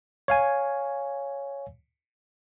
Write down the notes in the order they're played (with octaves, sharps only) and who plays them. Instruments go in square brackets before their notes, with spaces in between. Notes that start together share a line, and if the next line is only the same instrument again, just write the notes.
[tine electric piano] C#5 F5 G#5